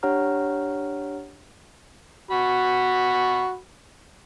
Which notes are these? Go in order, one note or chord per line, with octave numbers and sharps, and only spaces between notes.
D4 G4 C#5 F#5 A#5 F6
F#4 B5